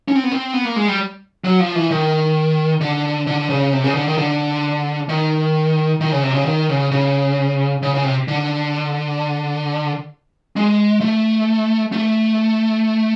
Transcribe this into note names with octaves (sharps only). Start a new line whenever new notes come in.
C#4
C4
B3
C4
B3
A#3
G#3
G3
F#3
F3
E3
D#3
D3
D3
C#3
C3
C#3
D3
D#3
D3
D#3
D#3
C#3
C3
C#3
D#3
C#3
C#3
C#3
C#3
C3
D3
G#3
A3
A3